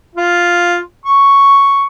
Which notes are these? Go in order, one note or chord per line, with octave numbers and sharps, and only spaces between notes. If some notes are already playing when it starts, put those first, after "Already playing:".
F4
C#6